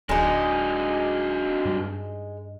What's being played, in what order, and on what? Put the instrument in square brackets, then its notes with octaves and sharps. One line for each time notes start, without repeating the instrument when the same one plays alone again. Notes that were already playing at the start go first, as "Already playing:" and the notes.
[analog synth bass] D1 [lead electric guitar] F#3 D4 [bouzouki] G#3 D#4
[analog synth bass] G2